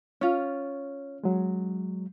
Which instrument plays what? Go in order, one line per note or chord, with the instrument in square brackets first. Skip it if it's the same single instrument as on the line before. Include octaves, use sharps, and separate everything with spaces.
[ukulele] C#4 F4 [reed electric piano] C#5
[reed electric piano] F#3 G#3